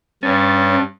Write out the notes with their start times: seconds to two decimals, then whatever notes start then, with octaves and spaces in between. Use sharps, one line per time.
0.23 G2 C#4 C#5 A6